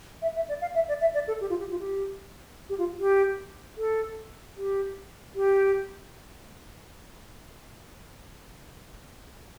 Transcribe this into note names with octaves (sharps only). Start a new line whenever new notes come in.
E5
E5
D5
F5
E5
D5
E5
D5
A4
G4
F4
G4
F4
G4
G4
F4
G4
A4
G4
G4